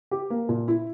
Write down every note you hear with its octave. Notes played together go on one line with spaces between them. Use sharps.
G4
A#3
A#2
E4